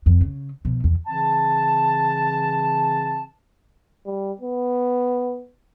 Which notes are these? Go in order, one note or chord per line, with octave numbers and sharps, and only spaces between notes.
F2
C#3
B2 F3
E2
C#3 E3 C4 A5
G3
B3